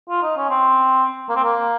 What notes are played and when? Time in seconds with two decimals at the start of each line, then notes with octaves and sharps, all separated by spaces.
0.09 F4
0.22 D#4
0.37 C#4
0.50 C4
1.29 A#3
1.36 C4
1.44 A#3